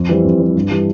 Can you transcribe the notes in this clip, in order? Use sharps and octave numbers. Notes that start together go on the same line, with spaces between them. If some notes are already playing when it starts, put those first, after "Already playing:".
Already playing: F2
E3 G3 C4
F2
E3 G3 C4
G2
E3 G3 D4